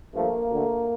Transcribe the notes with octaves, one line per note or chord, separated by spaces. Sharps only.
G2 F3 A3 A#3
D2 D3 A3